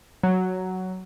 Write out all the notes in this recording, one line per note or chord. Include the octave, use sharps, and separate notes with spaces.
F#3